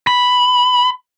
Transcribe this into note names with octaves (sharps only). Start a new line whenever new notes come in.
B5